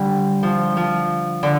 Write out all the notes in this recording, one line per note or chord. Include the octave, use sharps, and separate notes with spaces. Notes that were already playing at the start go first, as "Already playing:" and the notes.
Already playing: D3 G3
F3
F3
D3